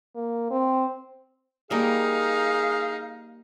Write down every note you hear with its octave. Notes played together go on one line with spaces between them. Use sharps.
A#3
C4
G3 A#3 D#4 G#4 F5